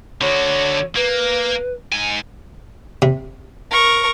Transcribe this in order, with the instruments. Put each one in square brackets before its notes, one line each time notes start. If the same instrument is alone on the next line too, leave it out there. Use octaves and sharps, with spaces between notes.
[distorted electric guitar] D3 F#4 [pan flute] C#5
[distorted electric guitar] A#3 [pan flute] B4
[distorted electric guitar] G#2 G#5
[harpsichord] C3
[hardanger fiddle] A#4 C#6